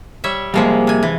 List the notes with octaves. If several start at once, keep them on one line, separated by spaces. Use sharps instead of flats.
G3 C#5 E5
C3 F3 G3 G#3 A#3 G#4
C3 G#5
E3